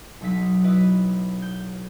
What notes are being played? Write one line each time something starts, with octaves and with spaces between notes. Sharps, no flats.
B1 F#3 D#4 B6
E4 B4 D#5
G6